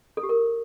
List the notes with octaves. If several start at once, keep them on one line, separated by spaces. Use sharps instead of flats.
A4
G4
A#4